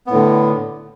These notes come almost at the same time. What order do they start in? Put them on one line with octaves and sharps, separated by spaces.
B3 A2 D3